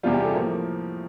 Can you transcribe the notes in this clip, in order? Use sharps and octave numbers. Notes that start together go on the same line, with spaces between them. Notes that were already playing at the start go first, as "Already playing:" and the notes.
E2 C3 G3 F4
G4
A4
A2 F3 A#3 A#4